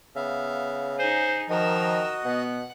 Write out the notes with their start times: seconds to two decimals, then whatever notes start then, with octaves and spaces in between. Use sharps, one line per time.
0.16 C#3 B3 E5 F5
0.99 D#4 G#4 C5
1.50 D#3 F3 F#4 A#4 D#5 E6
2.25 B2 B3 F#5